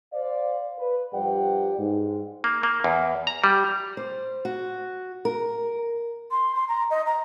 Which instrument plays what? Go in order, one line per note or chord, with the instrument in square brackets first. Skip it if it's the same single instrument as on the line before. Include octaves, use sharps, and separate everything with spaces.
[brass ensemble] C5 D5 F5
B4
G2 F3 G4 D5 F#5 G5
G#2
[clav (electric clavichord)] A#3
A#3
E2
A#5
G3
[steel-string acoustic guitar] C5
F#4
A#4
[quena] C6
C6
A#5
D#5
A#5